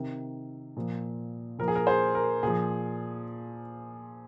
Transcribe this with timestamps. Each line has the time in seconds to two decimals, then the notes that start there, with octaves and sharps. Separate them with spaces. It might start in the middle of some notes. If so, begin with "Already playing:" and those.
Already playing: C3 D#3
0.76 A#2 F3
1.58 A#2 F3 A#4
1.68 G#4
1.75 A#4
1.87 G#4 C5
2.15 A#4
2.43 A#2 F3 G#4